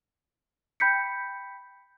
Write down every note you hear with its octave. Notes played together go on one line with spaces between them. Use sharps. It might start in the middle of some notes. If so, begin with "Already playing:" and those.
G5 B5 G6 B6 C#7